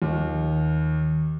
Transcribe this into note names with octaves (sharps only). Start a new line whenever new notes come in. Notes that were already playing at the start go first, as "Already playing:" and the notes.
D#2